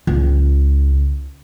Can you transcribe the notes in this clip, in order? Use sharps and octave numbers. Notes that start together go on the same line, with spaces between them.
C#2